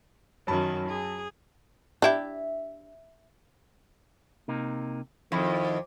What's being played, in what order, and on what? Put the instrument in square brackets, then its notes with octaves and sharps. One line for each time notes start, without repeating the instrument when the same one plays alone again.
[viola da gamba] F#2 D#3 [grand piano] F#3 A5 B5
[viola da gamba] G#4
[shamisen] D4 E4 G4 [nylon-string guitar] E5
[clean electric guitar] C3 A#3 D#4
[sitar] F2 [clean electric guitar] D#3 E4